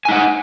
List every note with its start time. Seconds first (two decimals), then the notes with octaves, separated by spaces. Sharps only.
0.05 G#5
0.08 D#4
0.12 F#5